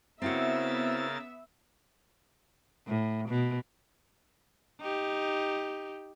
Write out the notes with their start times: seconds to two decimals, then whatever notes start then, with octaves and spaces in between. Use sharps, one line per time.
0.22 C#3 B3 C4 E4 F#4 A#4 E5 A6
2.87 A2
3.29 B2
4.80 D#4 G4